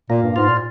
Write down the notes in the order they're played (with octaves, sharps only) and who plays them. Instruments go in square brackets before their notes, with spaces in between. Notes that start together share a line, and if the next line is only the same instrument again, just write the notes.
[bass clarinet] A#2 [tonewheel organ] A#3
[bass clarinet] G2
[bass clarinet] G#2 [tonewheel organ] F4
[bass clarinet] A#2